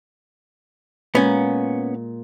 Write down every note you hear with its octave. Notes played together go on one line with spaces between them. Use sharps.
A#2 G#3 B3 C#4